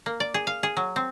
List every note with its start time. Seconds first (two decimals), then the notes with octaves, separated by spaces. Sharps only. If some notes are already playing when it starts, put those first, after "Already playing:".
0.06 A#3
0.20 D5
0.34 G#4
0.47 F5
0.63 G#4
0.77 F#3
0.96 C4